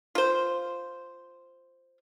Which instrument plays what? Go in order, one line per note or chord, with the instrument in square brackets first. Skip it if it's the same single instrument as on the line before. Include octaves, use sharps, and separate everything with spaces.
[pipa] F4 C5